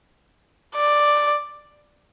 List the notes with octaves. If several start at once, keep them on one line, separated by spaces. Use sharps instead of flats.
D5